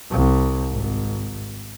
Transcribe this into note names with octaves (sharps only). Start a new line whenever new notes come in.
C2
G#1